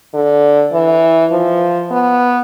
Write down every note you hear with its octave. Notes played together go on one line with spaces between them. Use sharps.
D3
E3
F3
B3